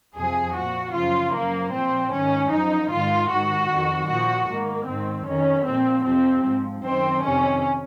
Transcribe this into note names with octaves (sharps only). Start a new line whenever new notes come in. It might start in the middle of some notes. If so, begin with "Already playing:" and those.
F2 C3 F3 G#4
A#2 F3 F#4
F#2 C#3 F3 F4
F#2 F3 A#3
A#2 F3 C4
G#2 D#3 C#4
F#2 F3 D#4
G#2 D#3 F4
G#2 D#3 F#4
F2 D#3
A#2 F3 F#4
G#2 D#3 A#3
G#2 D#3 C4
F2 D#3 C#4
A#2 F3 C4
F2 C3 F3 C4
G#2 F3
F#2 D#3 C4
F2 C3 D#3 C#4